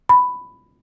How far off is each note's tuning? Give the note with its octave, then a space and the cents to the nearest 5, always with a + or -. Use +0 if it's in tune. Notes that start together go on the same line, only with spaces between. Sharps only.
B5 +10